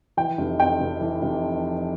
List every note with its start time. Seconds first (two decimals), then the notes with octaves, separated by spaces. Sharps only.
0.17 E3 G5
0.38 F1
0.59 F2 G5
0.80 F1
1.01 E3
1.22 F1